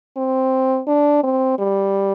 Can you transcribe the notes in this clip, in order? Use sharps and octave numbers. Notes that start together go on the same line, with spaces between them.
C4
D4
C4
G3